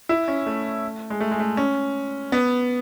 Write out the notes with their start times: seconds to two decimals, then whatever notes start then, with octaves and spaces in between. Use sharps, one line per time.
0.09 E4
0.28 C#4
0.46 A3
1.10 G#3
1.21 A3
1.31 G#3
1.40 A3
1.57 C#4
2.32 B3